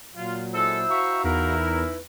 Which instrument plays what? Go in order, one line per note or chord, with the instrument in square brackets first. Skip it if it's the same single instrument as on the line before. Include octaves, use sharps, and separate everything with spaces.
[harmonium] A#2 F#3 [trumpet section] F4
[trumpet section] G#3 A4 [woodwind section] E4 C5 E6
[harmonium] F#4 F5 A#5 [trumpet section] E5 C#6
[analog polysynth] E2 [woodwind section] E3 D#4 E4 [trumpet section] A#4
[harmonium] B4